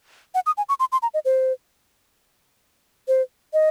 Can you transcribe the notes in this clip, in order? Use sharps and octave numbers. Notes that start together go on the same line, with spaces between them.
F#5
D#6
G#5
C#6
C6
C6
A#5
D#5
C5
C5
D#5